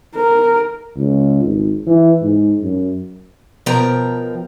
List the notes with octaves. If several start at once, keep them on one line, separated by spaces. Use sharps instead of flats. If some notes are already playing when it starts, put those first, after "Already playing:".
A#4
C#2
G#1
E3
G#2
F#2
B2 F3 A#4 G5 A#5